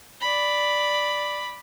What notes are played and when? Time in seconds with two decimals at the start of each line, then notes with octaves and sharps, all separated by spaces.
0.21 D5 B5